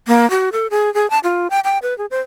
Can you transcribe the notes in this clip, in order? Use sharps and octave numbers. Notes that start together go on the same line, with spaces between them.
A#3
F#4
A4
G#4
G#4
A5
F4
G5
G5
B4
G#4
C5